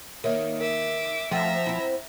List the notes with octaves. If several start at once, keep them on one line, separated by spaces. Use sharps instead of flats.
D#3 A#3 A#4 C#5 E5
A#4 E5 D6
F3 A3 C4 E5 F#5 G5 A#5 A6
C4 E4